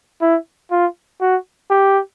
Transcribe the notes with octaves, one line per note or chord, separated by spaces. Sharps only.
E4
F4
F#4
G4